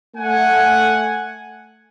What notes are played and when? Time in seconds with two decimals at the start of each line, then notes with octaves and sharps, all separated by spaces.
0.16 A3 F#5 G#5